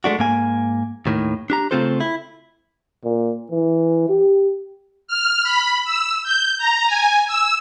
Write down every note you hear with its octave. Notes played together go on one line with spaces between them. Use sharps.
G#3 A3 D4 F#4
G#2 A#3 G#5
D#2 A2 D#3
D4 G4 A#5
C#3 A3 C4 F4 A4 C5
E4
A#2
E3
G4
F6
B5
E6
G6
A#5
G#5
E6